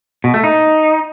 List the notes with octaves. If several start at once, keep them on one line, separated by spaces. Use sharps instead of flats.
B2
A3
D#4